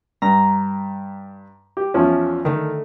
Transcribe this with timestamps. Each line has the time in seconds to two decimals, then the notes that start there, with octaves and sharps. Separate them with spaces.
0.22 G2 A#5
1.77 G4
1.94 E2 F3 C#4
2.45 D3 D#3 A3